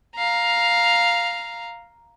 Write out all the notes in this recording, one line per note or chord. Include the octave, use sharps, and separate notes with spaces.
F5 A#5